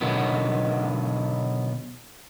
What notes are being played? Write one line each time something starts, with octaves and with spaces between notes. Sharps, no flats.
B2 D3 D#3 F#3 B3